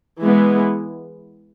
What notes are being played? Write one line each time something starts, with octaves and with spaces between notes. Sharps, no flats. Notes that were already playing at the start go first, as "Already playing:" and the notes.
E3 G#3 B3